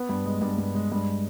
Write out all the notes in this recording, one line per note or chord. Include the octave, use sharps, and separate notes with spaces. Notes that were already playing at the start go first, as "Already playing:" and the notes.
Already playing: B3
G2
G#3
G2
G2
G#3
G2